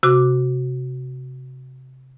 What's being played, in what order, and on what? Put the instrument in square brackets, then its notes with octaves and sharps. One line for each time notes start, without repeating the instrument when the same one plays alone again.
[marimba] C3 F#4 D6